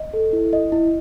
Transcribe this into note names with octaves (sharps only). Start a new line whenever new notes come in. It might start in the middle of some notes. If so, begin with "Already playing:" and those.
Already playing: D#5
A4
E4
D#5
E4